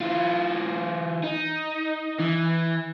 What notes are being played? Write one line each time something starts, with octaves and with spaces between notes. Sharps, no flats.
E3 F4
D#4
E3